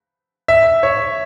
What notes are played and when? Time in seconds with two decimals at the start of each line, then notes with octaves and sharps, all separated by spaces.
0.48 E5
0.83 C#5